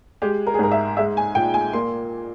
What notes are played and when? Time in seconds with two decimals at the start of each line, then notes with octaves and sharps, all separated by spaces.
0.22 G#3 G4
0.47 A#4
0.54 G#4
0.59 G#2 A#4
0.71 E5
0.97 G#3 E5
1.17 G#5
1.35 A#2 G5
1.54 G#5
1.73 A#3 C6